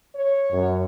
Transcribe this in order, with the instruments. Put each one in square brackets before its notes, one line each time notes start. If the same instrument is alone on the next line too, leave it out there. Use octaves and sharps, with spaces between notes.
[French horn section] C#5
[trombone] F#2